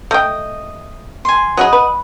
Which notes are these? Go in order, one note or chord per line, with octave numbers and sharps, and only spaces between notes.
A3 D#5 G5
G#5 C6
F#3 G#4 D#5 F#5 B5
B4